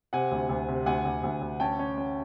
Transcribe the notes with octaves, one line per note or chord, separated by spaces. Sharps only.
C3 F#5 G#5
D2
D2
C3
D2 F#5 G#5
D2
D2
D2
C#4 G5 A5
C#4
C#4